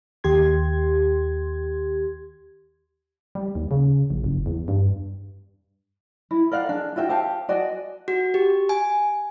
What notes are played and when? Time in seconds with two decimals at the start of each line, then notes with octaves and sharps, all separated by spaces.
0.24 D#2 G4 C6 G#6
3.35 G3
3.55 D#2
3.71 C#3
4.10 A#1
4.24 F#1
4.46 E2
4.68 G2
6.31 E4
6.51 A#4 D5 F5 F#5
6.69 D4 G#4
6.96 F4 F#4 E5 G5
7.09 G4 C5 F5 A5
7.49 F#4 D5 D#5 G#5
8.08 F#4
8.34 G4
8.69 G#5